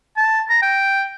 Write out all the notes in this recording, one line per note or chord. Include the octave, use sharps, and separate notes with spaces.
A5
A#5
G5